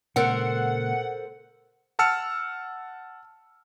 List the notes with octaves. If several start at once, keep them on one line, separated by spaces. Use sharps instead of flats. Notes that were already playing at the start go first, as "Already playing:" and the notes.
A#2 C#3 G#3 A4 A#4 C5 F#5
F#5 A5 E6 F6 C#7